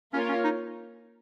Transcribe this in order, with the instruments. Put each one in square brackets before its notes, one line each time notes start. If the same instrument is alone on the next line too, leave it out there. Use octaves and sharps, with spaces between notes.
[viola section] A#3 F4 A#4 C#5 [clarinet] C#4
[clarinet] C#4
D#4